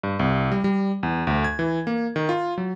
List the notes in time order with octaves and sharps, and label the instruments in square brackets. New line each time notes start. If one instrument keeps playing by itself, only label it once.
[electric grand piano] G2
C2
G3
G3
E2
D2
G#6
E3
A#3
D#3
F4
F#3